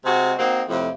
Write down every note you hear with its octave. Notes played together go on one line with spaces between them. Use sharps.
C3 G#3 F#4 G#4
A#3 C4 D#4 F#4
F2 A2 C3 F3